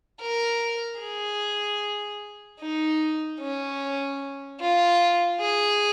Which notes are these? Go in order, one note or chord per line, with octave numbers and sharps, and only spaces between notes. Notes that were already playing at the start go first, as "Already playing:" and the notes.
A#4
G#4
D#4
C#4
F4
G#4